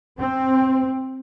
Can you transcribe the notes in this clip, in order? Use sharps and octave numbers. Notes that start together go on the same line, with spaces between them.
C4